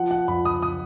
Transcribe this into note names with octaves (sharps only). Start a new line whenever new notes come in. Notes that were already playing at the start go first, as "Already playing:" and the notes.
Already playing: F3 F#5
F#5
F2 B5
D#6
D#6